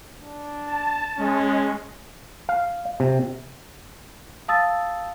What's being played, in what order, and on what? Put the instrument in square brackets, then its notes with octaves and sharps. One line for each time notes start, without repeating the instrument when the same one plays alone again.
[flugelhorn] D4
[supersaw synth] A5
[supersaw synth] G#3 [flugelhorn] C#4
[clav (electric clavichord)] F5
C3
[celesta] F5 A5 D#6 E6 A6